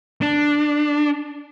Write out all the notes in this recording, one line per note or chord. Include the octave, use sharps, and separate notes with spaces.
D4